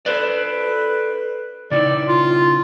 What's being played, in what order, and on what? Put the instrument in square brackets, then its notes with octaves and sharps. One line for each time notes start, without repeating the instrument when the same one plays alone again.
[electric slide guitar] A4 C5 D5 [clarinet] B4
[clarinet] B4
[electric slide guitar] C#3 D#4 E4 [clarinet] D5
[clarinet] F4